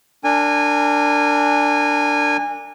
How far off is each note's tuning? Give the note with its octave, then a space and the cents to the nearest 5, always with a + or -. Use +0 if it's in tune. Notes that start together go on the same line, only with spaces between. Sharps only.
D4 +0 A#4 -30 G#5 -20